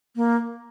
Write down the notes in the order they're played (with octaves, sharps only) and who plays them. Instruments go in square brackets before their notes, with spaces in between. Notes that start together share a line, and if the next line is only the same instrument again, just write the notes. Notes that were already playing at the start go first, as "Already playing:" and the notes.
[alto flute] A#3